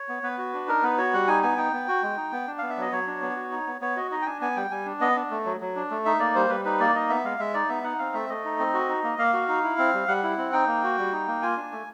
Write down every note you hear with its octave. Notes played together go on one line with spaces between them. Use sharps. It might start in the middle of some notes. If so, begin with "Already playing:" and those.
Already playing: C#5
B3
B3 B4
F#4
D4
D#4 A#4
B3 B4
F#4 C#5
G3 F#5
D#4 G#5
B3 G#5
D#4 G5
B3
F#4
G#3
D#4
B3
D4
B3 F5
E5
F#3 D#5
F#3 C#5
D4
B3
F#4
D#4
B3
B3 C#5
F#4 D#5
D#4 D#5
G5
D4 G#5
B3 G#5
G3 G5
G3 G#5
D4
B3 D#5
D4
A3
F#3
F#3
D4
A3
D#4 E5
A#3 D5
G3 C5
G3 B4
D#4 B4
A#3 D5
D#4 D#5
B3 E5
G#3 F5
G#3 E5
D#4 D5
B3 E5
D#4 F#5
C4 F5
A3 E5
A3 D#5
D#4
C4
F#4
D#4
A#3
A#3 F5
F#4
D#4
E4
C4
G3
G3 F#5
E4
C4
D#4 G5
A#3
F#4
G3
D#4
A#3
F4 G#5
D4
A3